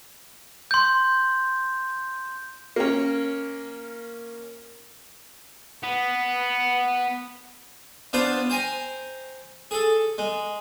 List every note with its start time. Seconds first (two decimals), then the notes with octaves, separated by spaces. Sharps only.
0.71 C6 G6
2.76 A#3 C#4
5.83 B3
8.13 B3 D4 F4 C5 F5 A5
8.50 C5 G5 G#5 A#5
9.71 G#4 A4
10.18 G#3